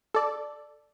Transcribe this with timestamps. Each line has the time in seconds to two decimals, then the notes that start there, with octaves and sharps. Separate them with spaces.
0.14 A4 D5